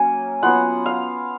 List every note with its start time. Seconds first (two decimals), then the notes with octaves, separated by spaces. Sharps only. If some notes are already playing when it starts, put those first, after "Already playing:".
Already playing: F#3 A#3 C#4 G#5
0.42 F#3 B3 F4 F#5
0.86 F5